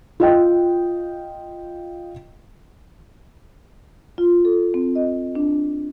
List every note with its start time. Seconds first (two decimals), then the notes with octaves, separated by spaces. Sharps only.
0.20 F4 D#5 G5
4.18 F4
4.45 A4
4.74 C4
4.95 D#5
5.35 D4